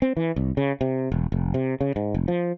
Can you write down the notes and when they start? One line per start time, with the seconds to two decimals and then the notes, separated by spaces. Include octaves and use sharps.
0.02 C4
0.17 E3
0.36 C2
0.57 C#3
0.81 C3
1.12 E1
1.32 F1
1.54 C3
1.81 C#3
1.96 G#2
2.14 F1
2.28 F3